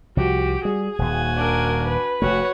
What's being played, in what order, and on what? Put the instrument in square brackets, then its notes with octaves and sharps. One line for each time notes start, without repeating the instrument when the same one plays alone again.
[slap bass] C2 F3 [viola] F#4 G4
[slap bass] G3 [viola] G#4
[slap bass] D#1 D#2 [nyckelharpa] F#4 G#5
[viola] D4 A#4
B4
[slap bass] F1 A3 [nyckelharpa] F#4 C#5